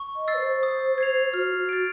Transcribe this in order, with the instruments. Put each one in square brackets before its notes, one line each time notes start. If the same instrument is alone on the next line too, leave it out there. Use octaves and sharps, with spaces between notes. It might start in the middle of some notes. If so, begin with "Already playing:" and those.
Already playing: [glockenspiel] C#6
[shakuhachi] D#5
[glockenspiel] E6 A6 C7
[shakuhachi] B4
C5
[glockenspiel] D#6
G#6 C7 F7
[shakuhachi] F#4 [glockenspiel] F6
[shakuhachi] F#4
[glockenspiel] A6 D7